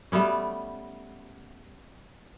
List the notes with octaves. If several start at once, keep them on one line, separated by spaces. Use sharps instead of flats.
G3 A3 B3 C#4